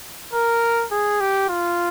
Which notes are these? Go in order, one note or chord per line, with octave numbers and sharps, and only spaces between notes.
A#4
G#4
G4
F4